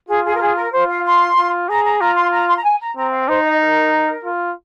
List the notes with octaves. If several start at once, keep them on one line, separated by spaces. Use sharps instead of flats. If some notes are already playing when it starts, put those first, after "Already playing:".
F4 G#4
G#4
A#4
G#4
A#4
F4 C5
F5
C6
F4
G#4 A#5
A#5
F4 A#5
C6
A#5
C6
A#5
G#5
A#5
C4 A#5
F5
D#4 C5
D#5
A#4
F4